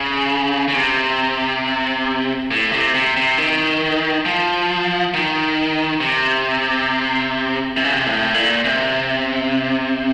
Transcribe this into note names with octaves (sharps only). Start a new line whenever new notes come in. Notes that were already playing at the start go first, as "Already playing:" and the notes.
Already playing: C#3
C#3
C3
A2
C3
C3
C3
D#3
F3
D#3
C3
C3
C#3
C3
A2
A#2
C3